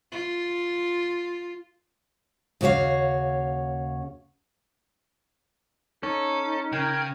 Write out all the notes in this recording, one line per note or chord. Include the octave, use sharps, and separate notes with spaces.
F4
D#2 C#3 F#4 C#5 F5
C#4 D#4 A4
C#3 A#4 G5 G#6